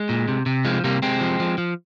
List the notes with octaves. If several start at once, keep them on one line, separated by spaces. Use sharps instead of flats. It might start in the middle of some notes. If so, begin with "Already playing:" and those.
Already playing: G#3
A#2
C3
C3
F3 G#3
C3 G3 A#3
C3 G#3 C4
F3
F3
F3